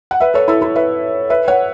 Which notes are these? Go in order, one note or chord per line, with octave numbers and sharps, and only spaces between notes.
F#5
B4 E5
A4 C#5
E4 A4
E4 A4
B4 E5
B4 E5
C#5 F#5